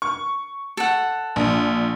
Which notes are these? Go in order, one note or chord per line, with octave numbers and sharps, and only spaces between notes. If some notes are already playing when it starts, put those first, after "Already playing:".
C#6
A4 F#5
A#1